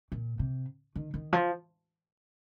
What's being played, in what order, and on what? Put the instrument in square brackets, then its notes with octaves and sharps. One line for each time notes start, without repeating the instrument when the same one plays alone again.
[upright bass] A#2
C3
D#3
D#3
F3